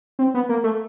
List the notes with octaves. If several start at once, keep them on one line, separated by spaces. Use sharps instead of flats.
C4
B3
A#3
A3